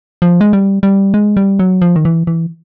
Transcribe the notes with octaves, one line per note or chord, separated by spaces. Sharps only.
F3
G#3
G3
G3
G#3
G3
F#3
F3
D#3
E3
E3